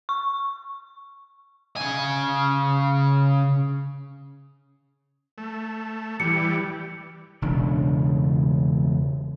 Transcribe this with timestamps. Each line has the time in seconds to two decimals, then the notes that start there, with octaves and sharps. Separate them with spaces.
0.09 C#6
1.77 C#3 G#5
5.38 A3
6.20 E3 G3 C#7
7.42 E1 C#3 D4